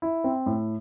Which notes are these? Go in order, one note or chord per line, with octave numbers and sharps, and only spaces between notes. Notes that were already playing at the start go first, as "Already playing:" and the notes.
E4
C4
A2